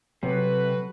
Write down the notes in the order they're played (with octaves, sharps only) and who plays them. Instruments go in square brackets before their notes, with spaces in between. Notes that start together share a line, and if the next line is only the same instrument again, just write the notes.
[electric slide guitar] C3 [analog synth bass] F#3 [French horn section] F#4 A4 B4